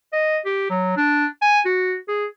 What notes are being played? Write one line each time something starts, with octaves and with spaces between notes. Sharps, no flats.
D#5
G4
F#3
D4
G#5
F#4
G#4